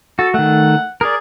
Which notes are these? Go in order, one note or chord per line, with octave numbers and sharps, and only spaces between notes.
F#4 A4
D#3 A3 F#5
G#4 A#4 D5